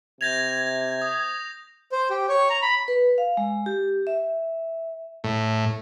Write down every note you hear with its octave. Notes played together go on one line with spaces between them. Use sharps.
C3 G6 G#6 A#6 F7
D#6
C5
G4
C#5
A#5
B5
B4
F5
G#3
G4
E5
A2